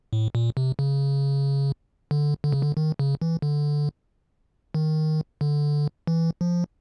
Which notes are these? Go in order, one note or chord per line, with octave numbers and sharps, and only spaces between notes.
A2
A#2
C3
C#3
D3
D3
C#3
D3
D#3
C#3
E3
D3
D#3
D3
E3
F3